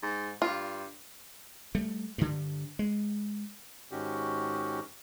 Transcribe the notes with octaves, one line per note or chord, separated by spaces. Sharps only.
G#2
G2 F4
G3 A3
G2 D3
G#3
G#2 D#3 C#4 F#4 G4